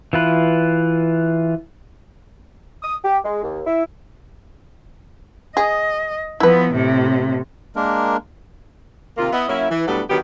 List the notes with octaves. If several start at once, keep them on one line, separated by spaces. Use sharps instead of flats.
E3 F4 B4
D#6
G4
G#3
D#2
E4
G#4 D#5
F3 B3 E4 B4
A2 C3
G#3 A#3 D4 A#4
D#2 C3 A#3 F4
B3 E4 D#5
F#3 A#3 C#4 E4
E3
A2 F#3 G3 B3 D4 A4
D3 D#3 F#3 B3 F#4 G4